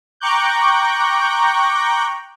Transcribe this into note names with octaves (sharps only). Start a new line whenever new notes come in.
G5 A#5 C#6 D6 F#6 G6